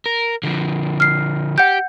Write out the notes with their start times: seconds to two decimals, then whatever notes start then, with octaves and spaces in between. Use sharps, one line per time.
0.06 A#4
0.43 D3 F3
1.00 F6 C7
1.58 G4 F#5 G6